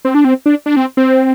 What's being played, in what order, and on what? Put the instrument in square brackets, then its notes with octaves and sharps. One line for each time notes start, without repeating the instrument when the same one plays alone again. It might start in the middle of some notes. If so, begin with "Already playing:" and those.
[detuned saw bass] C4
D4
C4
D4
D4
C4
C4